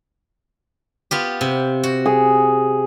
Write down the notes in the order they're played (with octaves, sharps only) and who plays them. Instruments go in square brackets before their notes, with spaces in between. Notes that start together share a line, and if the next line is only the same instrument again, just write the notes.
[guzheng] B3 F4 G4
C3
F#4
[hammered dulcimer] G#4